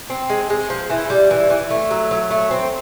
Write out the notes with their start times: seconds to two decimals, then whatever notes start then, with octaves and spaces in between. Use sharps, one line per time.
0.10 C4
0.30 G#3
0.50 G#3
0.70 F3
0.90 E3
1.10 G3
1.31 E3
1.50 E3
1.70 A3
1.91 F#3
2.11 F#3
2.31 A3
2.51 C4